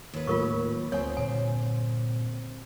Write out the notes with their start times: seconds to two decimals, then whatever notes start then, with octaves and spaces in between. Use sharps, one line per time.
0.13 D#2 B4
0.27 A2 F#3 A3 F4 A#4 C#6
0.92 D2 C4 C#5 G#5
1.17 G2 A#2 D3 G#5